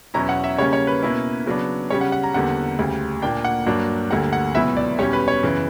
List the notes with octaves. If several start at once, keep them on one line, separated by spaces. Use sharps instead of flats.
E2 B2 F#3 C#4 E4 A#5
F#5
E5
C#3 G3 A#3 C#4 C#5
C#5
B4
B2 A#3 C#4 E4
C#3 F#3 B3 D4
C#3 G3 C#4 C#5
F#5
F#5
A#5
E2 D3 G3 A#3 F#5
D2 C#3 G3
A#2 A#3 D4 G5
F#5
G2 F#3 A#3 D4
D2 D3 G3 A#3 F#5
F#5
C#2 B2 F#3 B3 E4 E5
D5
E2 B2 G3 C#4 C#5
B4
C#5
F#2 C#3 E3 B3